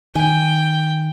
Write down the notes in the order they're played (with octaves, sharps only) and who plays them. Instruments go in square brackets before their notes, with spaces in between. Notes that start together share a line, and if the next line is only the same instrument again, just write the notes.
[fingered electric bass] D#3 [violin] G5 [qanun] G#5